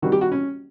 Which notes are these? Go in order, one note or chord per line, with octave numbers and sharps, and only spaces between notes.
D#3 G3 C4 F#4
G4
F#4
C#4